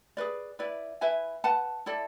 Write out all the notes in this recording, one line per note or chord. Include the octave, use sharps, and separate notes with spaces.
G#4 B4 D5
E4 B4 D5
E4 B4 E5 G#5
B4 F#5 A5
E4 A4 D5